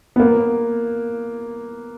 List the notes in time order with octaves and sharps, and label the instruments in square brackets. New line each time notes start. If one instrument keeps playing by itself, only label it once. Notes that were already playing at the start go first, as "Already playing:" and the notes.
[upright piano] B3
A#3